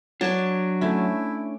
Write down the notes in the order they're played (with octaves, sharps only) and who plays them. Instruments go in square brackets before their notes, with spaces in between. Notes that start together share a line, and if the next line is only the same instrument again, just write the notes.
[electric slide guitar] F#3 [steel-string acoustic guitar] D4 C#5 [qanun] A5
[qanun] A3 C#4 [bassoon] E4